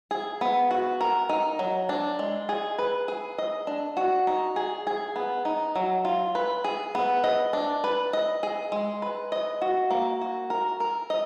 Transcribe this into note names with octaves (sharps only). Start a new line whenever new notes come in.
G#4
B3
F#4
A#4
D#4
F#3
D4
G#3
G#4
B4
G#4
D#5
D4
F#4
D#4
G#4
G#4
B3
D#4
F#3
F4
B4
G#4
B3
D#5
D4
B4
D#5
G#4
G#3
B4
D#5
F#4
A#3
F#4
A#4
A#4
D#5